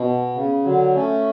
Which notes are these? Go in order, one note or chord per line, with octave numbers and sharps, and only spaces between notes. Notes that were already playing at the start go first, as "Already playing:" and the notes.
Already playing: B2
C#3
D3 F#3
A3 C#4